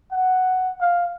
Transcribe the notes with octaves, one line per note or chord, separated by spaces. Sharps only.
F#5
F5